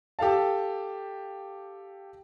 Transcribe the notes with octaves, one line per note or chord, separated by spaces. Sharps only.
G4 A4 F5 A5